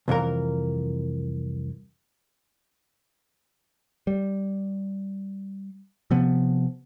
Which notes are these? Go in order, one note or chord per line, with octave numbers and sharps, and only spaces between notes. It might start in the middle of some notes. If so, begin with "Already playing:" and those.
C2 F2 E3 A#4
G3
C3 F3 B3